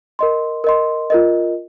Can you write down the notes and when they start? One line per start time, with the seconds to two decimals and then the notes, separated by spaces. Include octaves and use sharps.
0.19 A#4 D#5 C6
0.64 A#4 D#5 C6
1.10 F4 A#4 D#5